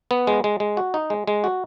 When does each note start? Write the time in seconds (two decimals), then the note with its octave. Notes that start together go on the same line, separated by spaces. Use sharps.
0.11 B3
0.27 G#3
0.44 G#3
0.60 G#3
0.77 F#4
0.94 D#4
1.10 G#3
1.27 G#3
1.44 F#4